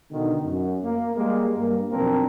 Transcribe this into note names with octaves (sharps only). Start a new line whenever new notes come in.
B2 D3 D#3
F#2
A#3
G3 G#3 A#3
G2 A#3
B1 F2 C4 D4 A#4